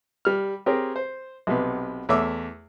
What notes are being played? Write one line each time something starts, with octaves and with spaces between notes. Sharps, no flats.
G3 F6
C4 G4 G#4 A#4 C#5
C5
B1 C3 B3
E2 A3 C#5 E5 D6 E6